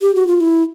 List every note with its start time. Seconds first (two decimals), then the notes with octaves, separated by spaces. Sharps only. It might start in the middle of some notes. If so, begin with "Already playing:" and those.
0.02 G4
0.15 F#4
0.27 F4
0.41 E4